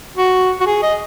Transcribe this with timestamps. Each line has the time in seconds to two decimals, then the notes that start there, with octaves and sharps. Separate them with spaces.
0.17 F#4
0.60 F#4
0.66 G#4
0.82 D#5